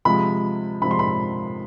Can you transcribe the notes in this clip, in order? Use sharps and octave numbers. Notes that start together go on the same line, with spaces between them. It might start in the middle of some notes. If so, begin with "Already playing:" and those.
C3 F3 G#3 B5
C3 F3 G#3 B5
C6
B5